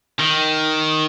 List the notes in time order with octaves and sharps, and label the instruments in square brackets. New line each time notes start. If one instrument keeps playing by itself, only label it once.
[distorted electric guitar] D#3